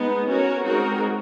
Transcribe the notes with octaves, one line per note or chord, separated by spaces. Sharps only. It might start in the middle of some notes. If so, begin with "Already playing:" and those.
Already playing: G#3 B3 D#4
C#4 F#4 A#4 C#5
G#3 C4 D#4 F#4 A#4